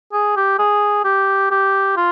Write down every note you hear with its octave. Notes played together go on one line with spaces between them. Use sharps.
G#4
G4
G#4
G4
G4
F4